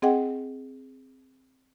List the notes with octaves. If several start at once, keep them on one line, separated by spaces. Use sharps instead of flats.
C4 G#4 D#5 F#5 G5